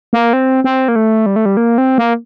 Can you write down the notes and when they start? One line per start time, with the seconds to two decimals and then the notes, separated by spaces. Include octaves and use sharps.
0.13 A#3
0.33 C4
0.64 C4
0.88 A#3
0.96 A3
1.26 G3
1.36 A3
1.46 G3
1.57 A#3
1.78 C4
1.98 A#3